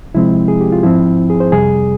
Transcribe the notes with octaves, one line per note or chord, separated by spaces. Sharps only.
C3 F3 G#3 C4 E4
G#4
G4
F4
G#2 F3 C4 E4
G#4
C5
F2 C3 G3 G#4